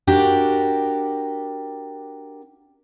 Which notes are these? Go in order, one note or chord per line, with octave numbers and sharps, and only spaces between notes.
D4 F#4 G4 A#4